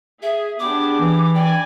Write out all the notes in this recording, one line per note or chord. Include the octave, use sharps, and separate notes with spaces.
G#4 E5
B3 D4 G4 G#4 D6
E3
D4 D5 G5 G#5